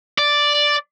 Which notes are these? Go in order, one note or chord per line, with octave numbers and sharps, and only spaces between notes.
D5